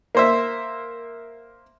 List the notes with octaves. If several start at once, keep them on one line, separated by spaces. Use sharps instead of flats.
A#3 C5 E5